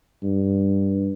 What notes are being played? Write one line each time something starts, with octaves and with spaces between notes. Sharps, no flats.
G2